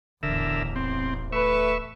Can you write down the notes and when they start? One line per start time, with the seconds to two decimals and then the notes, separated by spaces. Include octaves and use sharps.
0.23 D1 A1 E2 D3 A#4 E5
0.76 C4
1.32 A3 B4 E5 C#6